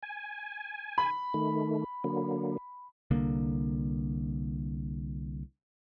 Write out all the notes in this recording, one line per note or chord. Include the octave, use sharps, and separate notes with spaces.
G#5
B5
D#3 A3
D3 F#3 A#3
C2 D3 A#3